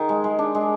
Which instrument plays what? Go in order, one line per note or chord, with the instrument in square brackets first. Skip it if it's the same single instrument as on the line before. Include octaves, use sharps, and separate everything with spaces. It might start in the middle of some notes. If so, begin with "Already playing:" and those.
Already playing: [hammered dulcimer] D#3 G#4
G#3
G#3
D4
G#3